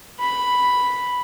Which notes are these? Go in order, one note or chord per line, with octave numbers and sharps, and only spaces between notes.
B5